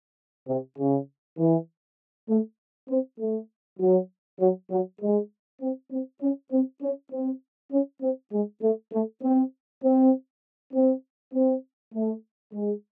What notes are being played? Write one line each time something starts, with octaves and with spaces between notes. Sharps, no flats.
C3
C#3
E3
A3
C4
A3
F#3
F#3
F#3
G#3
C4
C4
C#4
C4
C#4
C4
C#4
C4
G#3
A3
A3
C4
C4
C4
C4
A3
G#3